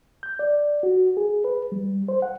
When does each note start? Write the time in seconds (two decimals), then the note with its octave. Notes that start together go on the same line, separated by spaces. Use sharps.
0.23 G6
0.39 D5
0.83 F#4
1.17 G#4
1.44 B4
1.72 G3
2.08 C5
2.22 F#5